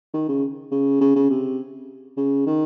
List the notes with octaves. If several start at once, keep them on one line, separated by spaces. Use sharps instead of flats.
D#3
C#3
C#3
C#3
C#3
C3
C#3
D#3